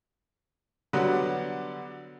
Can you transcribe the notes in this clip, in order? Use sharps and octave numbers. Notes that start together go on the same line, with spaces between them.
D3 F#3 G3 B3